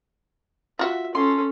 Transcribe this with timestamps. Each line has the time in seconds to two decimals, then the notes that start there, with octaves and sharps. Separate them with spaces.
0.79 F4 F#4 E5
1.15 C#4 A4 C6